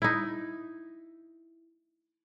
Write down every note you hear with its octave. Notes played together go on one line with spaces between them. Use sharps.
D#4 E4